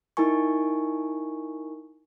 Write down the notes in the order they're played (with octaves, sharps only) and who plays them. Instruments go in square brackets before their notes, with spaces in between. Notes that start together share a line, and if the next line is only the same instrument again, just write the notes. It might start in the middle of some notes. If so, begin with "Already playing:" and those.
[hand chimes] D#4 E4 A#4 G#5 C#6